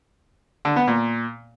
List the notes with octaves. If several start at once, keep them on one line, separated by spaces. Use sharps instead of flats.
D3
B3
A#2